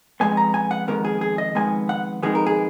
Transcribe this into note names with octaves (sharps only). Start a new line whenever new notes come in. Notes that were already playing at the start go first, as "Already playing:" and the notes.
F2 D#3 G#3 B3 G#5
A#5
G#5
F#5
F2 D#3 G#3 B3 A#4
G#4
G#4
D#5
F2 D#3 G#3 B3 G#5
F#5
F2 D#3 G#3 B3 G#4
A#4
G#4